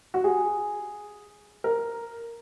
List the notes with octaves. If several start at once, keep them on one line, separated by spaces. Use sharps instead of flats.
F#4
G#4
A#4